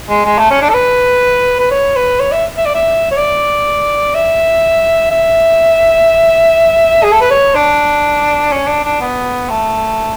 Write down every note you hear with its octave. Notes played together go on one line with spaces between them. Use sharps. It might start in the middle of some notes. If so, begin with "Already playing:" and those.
G#3
G#3
A3
C#4
D4
A4
B4
B4
C#5
B4
C#5
E5
E5
D5
E5
C#5
D5
E5
E5
G#4
A4
B4
C#5
D4
C#4
D4
D4
B3
A3